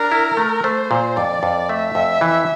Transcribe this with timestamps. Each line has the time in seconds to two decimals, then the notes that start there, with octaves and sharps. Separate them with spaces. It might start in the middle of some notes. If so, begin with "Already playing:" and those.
Already playing: D4 A#4
0.12 E4
0.37 A3
0.63 A3 C5
0.91 A#2
1.16 F2 D5
1.43 F2
1.69 A3 E5
1.95 F2
2.21 E3